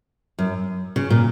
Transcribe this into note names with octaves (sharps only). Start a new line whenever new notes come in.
F#2
C#3
A#2